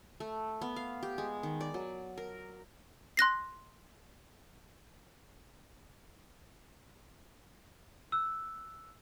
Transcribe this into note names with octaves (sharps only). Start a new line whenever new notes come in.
A3
B3
F5
G4
G#3
D#3
D5
F#3
A#4
C6 F#6 A#6 C7
E6 F#6